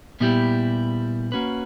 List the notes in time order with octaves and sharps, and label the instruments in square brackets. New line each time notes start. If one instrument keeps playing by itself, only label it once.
[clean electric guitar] A#2 G3 B3 E4 G4
A#3 C#4 F#4 B4